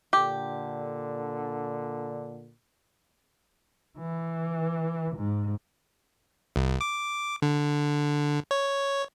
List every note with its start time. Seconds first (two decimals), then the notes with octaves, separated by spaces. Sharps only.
0.13 A#2 D3 G4
3.98 E3
5.17 G#2
6.56 C2
6.81 D6
7.42 D3
8.51 C#5